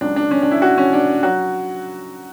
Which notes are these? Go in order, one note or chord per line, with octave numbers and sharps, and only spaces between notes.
C#2 C#3 F#3 D4
D4
C#4
D4
E4
F#4
C#4
D4
F#3 F#4